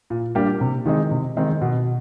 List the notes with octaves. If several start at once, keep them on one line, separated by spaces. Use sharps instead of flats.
A#2
G3 A#3 D4 G4
C3
D#3 G#3 C4 D#4
C3
D#3 G#3 C4 D#4
B2